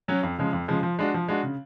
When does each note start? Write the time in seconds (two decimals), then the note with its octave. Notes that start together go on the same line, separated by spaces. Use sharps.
0.08 F#3 C#4 F#4
0.23 F2
0.39 C#3 F3 G#3
0.53 F2
0.68 C#3 F3 G#3
0.83 F3
0.99 G#3 D4 F#4
1.14 F3
1.28 G#3 D4 F#4
1.43 C#3